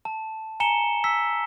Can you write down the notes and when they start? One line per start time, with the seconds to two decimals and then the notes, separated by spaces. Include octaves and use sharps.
0.05 A5
0.60 G#5 A#5 C#7 E7 G7
1.04 E6 B6